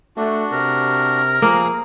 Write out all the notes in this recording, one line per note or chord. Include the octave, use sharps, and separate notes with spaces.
A3 D4 F#4
C3 A#4
F3 A#3 G#4 F5 D#6